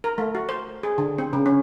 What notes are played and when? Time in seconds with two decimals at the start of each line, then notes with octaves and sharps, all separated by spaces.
0.04 A#4
0.18 A3
0.35 F#4
0.49 C5
0.83 G#4
0.98 D3
1.18 C4
1.33 C#3
1.46 C#4